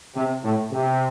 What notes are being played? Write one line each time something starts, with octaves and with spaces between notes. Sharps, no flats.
C3
A2
C3